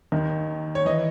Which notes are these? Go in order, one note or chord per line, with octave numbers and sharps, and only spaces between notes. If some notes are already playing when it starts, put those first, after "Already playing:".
D#2 D#3
C#5
E3 D#5